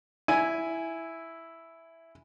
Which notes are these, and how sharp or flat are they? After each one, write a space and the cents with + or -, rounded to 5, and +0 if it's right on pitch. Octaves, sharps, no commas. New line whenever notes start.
E4 +0 G#5 +0